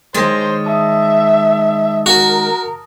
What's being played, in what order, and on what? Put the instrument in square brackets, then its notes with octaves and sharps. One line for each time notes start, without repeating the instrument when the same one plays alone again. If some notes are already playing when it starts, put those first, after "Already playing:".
[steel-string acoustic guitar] D#3 G#3 C#5 [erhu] C5 [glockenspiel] A6
[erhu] E5 [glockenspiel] A5 D#6
[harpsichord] F#4 [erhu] A#4